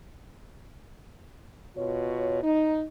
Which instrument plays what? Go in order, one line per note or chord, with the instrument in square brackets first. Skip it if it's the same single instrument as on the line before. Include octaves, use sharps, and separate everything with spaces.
[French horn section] B2 F4 C#5
D#4